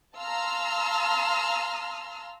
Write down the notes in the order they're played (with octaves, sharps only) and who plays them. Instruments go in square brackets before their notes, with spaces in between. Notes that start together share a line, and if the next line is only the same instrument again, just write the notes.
[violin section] F5 A5 A#5 C6 E6 F6